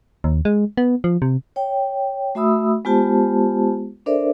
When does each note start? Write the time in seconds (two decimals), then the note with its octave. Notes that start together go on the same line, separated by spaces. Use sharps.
0.24 D#2
0.45 G#3
0.77 B3
1.04 F3
1.22 C3
1.56 C#5 G5
2.35 A3 F#4 E5 B5 D#6 E6
2.85 G#3 B3 F4 G4 C5 A5
4.06 D4 A4 A#4 C5 D5 E5